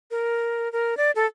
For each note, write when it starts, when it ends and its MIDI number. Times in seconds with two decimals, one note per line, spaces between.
0.11 0.71 70
0.72 0.97 70
0.97 1.11 74
1.16 1.26 69